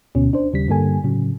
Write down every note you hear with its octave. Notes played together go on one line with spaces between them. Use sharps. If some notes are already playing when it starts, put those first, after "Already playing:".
D2 B2 C#4
D4 C5
D#2 C#3 G3 B6
G2 D3 G3 A#3 A4 G#5
A2 C#3 F#3